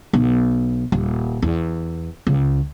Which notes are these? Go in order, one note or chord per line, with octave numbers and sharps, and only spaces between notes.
B1
D#1
E2
C#2